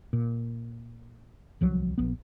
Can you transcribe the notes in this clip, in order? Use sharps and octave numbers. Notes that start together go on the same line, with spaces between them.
A#2
D1 C2 F3 F#3
A#1 B3